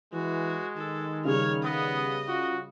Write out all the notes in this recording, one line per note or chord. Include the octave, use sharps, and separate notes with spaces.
E3 G#3 F#4
D#3 A4
C#3 G3 C#5 F6
B3 D#5
F4 F#4